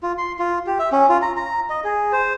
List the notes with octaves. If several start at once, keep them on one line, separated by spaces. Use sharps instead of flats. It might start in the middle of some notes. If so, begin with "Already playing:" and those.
F4
C6
F4
G4
E5
C#4
F4
A#5
A#5
D#5
G#4
C5